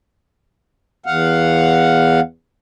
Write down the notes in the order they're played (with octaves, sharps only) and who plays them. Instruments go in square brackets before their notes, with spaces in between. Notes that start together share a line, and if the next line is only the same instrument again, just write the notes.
[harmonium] E2 F5 F#5